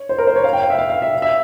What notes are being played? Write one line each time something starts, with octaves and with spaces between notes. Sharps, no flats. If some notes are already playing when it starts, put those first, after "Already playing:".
Already playing: C#5
C5
A#4
C5
C#5
F5
G5
F5
E5
F5
F5
E5
E5